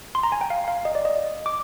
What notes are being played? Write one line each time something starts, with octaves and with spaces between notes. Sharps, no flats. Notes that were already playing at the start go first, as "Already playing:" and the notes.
C6
A#5
G#5
G5
F5
F5
D#5
D5
D#5
D6